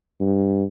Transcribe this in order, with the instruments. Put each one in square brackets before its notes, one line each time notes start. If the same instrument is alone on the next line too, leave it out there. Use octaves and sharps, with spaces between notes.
[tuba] G2